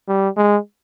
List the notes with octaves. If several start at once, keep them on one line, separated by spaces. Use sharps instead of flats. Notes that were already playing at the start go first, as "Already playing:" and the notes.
G3
G#3